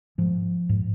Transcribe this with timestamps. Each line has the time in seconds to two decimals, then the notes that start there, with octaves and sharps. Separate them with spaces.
0.18 G#2 F3
0.69 G#2